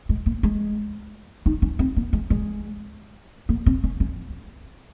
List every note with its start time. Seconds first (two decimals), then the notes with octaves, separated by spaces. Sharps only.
0.09 G#3
0.26 A#3
0.43 G#3
1.46 D#4
1.62 C#4
1.79 C4
1.96 A#3
2.13 G#3
2.30 G#3
3.49 A#3
3.66 C4
3.84 C#4
4.00 C#4